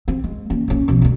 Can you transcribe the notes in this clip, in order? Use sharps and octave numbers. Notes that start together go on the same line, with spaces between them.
C4
G#3
A#3 C#4
A#1 C#4
B1 F3
D2 G2